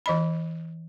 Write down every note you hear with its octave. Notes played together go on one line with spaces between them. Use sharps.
E3 D#5 B5